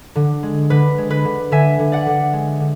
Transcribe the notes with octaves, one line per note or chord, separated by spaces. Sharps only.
D3
G#3
D3 B4
G#3
B4
D3
D3 E5 G#5
D3
D5 F#5
D3
G#3
D3